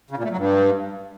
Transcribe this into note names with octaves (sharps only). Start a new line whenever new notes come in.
C#3
A#2
A3
F#3
G2